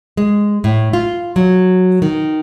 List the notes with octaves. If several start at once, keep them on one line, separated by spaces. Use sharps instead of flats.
G#3
A2
F4
F#3
D#3